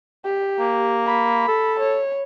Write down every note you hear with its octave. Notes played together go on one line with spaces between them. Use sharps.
G4
A#3
B5
A4
C#5